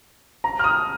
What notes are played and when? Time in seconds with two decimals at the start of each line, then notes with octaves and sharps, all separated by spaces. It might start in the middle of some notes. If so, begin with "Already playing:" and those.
0.44 A#5
0.59 F6
0.64 D#6